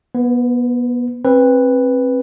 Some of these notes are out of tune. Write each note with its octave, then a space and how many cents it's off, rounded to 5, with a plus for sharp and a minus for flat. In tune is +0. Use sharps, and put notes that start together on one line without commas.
B3 -25 B4 +30
C4 +30 B4 +0